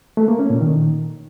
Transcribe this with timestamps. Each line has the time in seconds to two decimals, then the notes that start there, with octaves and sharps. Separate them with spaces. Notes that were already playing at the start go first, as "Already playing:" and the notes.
0.17 A3
0.28 A#3
0.39 C#4
0.50 A#2
0.61 D#3